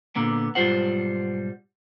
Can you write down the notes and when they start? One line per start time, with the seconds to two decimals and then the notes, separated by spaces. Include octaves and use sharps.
0.16 A#2 D3 A#3 B3
0.55 B1 G#2 G3 F4 C5 F#5